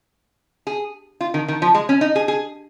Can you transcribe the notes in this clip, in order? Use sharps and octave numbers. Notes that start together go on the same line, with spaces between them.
G#4
F4
D#3
D#3
F3
G#3
C#4
D#4
G#4
G#4